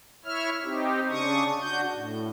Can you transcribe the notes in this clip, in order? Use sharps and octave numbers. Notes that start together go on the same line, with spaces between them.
E4 C#5 E5 F6
C4 D#4 G4
C#3 D4 C#6 D#6
D4 F#4 G6
A2